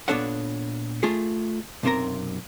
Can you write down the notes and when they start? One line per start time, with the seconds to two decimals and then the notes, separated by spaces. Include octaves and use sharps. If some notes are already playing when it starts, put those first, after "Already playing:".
0.08 A#2 B3 D4 A4 C#5 F#5
1.03 A3 F4 G#4
1.83 B1 F#2 C3 C4 A#4 A#5